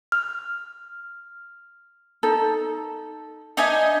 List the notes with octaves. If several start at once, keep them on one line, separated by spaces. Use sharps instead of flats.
F6
D#4 A4
D4 D#4 D#5 E5 G#5